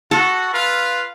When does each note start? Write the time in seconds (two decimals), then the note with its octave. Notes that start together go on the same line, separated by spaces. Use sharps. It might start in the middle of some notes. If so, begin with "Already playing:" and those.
0.11 F#4 A4
0.52 F4 B4 F5